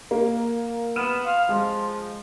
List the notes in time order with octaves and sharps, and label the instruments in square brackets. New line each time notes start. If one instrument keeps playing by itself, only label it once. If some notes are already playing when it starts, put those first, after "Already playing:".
[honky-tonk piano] A#3
[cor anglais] B3 [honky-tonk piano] F6 D#7 E7
[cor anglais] F5
[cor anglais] F3 [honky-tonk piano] G#3